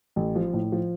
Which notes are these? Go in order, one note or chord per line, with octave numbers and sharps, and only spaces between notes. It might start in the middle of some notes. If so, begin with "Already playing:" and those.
A1
F3
A2
F3